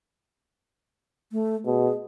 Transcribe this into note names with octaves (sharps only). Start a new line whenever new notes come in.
A3
B2 G#4